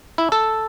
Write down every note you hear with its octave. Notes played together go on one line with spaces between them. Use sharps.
E4
A4